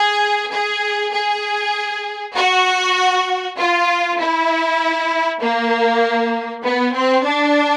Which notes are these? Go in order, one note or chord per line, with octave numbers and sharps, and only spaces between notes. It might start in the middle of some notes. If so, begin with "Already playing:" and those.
Already playing: G#4
G#4
G#4
F#4
F4
E4
A#3
B3
C4
D4